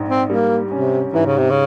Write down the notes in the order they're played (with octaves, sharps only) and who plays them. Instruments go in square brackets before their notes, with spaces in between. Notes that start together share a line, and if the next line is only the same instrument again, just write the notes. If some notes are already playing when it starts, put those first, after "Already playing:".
Already playing: [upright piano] A#1 G#2
[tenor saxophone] C4
[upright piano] G3 [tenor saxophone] A#3
[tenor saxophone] C3 [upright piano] C#4
[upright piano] G#2 [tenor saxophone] E3
[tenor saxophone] C#3
C3
C#3